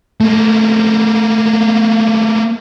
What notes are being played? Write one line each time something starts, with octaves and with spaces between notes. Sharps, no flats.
A3 A#3